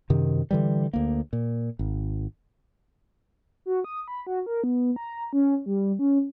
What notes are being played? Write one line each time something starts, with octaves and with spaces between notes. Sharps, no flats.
F#2 C3 D#3
D3 E3 G3
D2 A#3
A#2
G#1
F#4
D#6
B5
F#4
A#4
B3
A#5
C#4
G3
C#4